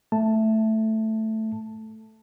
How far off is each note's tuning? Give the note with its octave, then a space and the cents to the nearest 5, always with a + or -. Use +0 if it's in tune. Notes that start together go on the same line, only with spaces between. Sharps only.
A3 +0 A5 +5